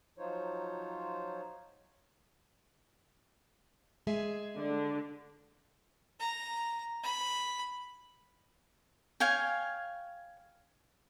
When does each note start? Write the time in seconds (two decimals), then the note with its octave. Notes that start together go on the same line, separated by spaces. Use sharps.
0.18 F3 F#3 D#4 F4 C5 C#5
4.07 G#3 G#4 E5
4.58 D3
6.20 A#5
7.03 B5
9.20 C#5 F5 G5 G#5